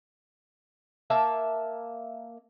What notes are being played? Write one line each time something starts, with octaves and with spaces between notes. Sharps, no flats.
A#3 E5 A5